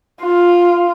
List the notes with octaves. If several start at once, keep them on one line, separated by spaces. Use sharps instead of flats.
F4